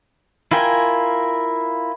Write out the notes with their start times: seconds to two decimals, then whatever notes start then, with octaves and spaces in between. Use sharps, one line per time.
0.52 E4 F4 A#4 G5 G#5